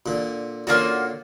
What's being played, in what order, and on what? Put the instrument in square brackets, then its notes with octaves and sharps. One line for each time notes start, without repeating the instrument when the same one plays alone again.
[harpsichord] A#2 D3
[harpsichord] A#2 D3 C#4 [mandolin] A#3 F4 F#4